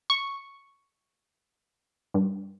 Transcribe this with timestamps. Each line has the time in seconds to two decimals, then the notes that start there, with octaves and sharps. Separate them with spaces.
0.10 C#6
2.14 G2